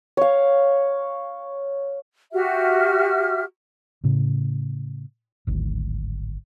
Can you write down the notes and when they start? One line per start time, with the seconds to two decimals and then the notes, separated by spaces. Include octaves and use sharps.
0.17 C#5 F5
2.33 F#4 G4 E5 F6
4.04 A2 C#3
5.47 D1 G#1 D2